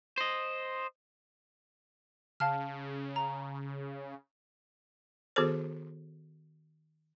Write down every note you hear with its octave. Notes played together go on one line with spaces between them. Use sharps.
C5 D#5
C#3 F5 A5 F6
A#5
D#3 B3 F#4 G#4 A4 C5